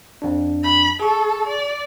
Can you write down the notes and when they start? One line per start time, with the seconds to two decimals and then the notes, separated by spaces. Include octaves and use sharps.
0.22 F2 D4
0.63 B5
1.00 G#4 A4 C#6
1.47 D5